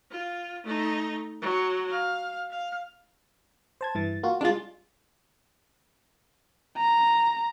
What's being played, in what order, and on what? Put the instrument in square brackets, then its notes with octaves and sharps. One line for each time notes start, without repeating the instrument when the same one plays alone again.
[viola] F4
A3 D#4
F#3
F5
F5
[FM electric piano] C5 A5 G#6
G2 E3 A6
A#3 F4 F#4
[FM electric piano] G3 G#3 [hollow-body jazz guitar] D4 F4
[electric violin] A#5